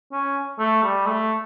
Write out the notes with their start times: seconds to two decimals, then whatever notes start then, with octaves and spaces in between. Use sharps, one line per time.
0.12 C#4
0.59 A3
0.83 G3
1.07 A3